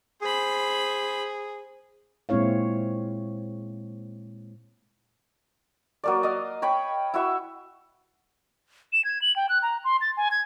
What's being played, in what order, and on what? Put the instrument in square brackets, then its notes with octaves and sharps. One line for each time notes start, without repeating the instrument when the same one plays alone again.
[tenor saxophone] G#4 [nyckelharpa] C5 B5
[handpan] A#2 G#3 C4 E4 C#5 F5
[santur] F#3 A#3 D5
D#5 F5
C#5 G5 B5
E4 F#4 E5
[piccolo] E7
G#6
F#7
G5
F#6
A#5
C6
A6
G#5
G#6